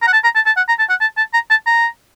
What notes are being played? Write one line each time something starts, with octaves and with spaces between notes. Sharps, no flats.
A#5
F#5
A5
A#5
A5
A5
F#5
A#5
A5
F#5
A5
A5
A#5
A5
A#5